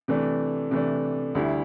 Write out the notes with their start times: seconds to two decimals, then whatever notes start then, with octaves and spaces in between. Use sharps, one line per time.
0.08 C3 E3 A3 D4
0.71 C3 E3 A3 D4
1.35 D2 D3 G3 E4